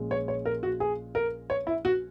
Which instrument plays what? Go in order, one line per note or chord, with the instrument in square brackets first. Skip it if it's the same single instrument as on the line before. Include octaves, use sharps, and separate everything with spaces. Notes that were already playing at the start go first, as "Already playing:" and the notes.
Already playing: [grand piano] A#1 A#2 G#3 C#4
[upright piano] C#5
C#5
A#4
F#4
G#4
A#4
C#5
E4
F#4